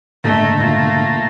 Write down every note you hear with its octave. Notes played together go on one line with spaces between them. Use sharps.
F#1 G#2 D3 A3 A#3 A4 G7
B1 A3 F4 G#6